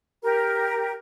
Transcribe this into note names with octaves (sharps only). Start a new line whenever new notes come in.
G4 A#4